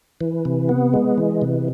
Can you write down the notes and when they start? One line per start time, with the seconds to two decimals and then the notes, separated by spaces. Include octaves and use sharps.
0.21 E3
0.45 C3
0.69 B3
0.94 G#3
1.18 E3
1.42 C3